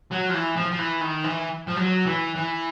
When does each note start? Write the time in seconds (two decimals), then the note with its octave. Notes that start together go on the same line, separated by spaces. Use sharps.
0.12 F#3
0.30 F3
0.34 E3
0.56 F3
0.71 F3
0.79 E3
1.01 D#3
1.24 E3
1.67 F3
1.76 F#3
2.06 E3
2.36 E3